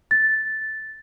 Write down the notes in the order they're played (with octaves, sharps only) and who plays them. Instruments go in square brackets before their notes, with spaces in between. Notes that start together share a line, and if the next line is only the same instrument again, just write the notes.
[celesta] A6